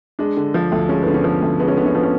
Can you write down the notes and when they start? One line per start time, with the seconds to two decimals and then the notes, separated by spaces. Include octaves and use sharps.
0.19 G#3 D4
0.37 D3
0.54 F3
0.72 D2
0.89 G#3 C#4
1.02 D3 B3
1.14 C#4
1.24 F3
1.42 D2
1.60 G#3 B3
1.68 C#4
1.77 D3 B3
1.86 C#4
1.94 F3 B3
2.03 C#4